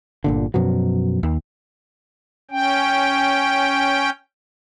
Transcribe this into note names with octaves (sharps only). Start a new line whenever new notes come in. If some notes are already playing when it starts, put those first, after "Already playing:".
G1 A#2 D3
F#2 B2 F3 F#3
D#2
C#4 G5